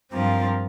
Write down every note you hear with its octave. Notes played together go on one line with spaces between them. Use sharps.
G2 F3 C4 F4 A#4